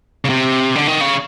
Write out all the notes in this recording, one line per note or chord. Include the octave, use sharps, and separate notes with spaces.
C#3
C3
D3
D#3
C#3